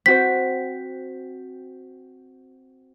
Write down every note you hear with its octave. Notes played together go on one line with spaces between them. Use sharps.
C4 F#4 C5 B6